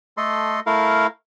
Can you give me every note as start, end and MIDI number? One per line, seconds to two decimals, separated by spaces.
0.17 0.60 57
0.17 0.60 69
0.17 0.60 75
0.17 0.60 84
0.66 1.07 57
0.66 1.07 64
0.66 1.07 70
0.66 1.07 77